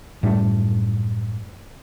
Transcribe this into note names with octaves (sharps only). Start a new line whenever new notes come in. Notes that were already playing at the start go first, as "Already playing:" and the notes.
F#2 A2 G3 A3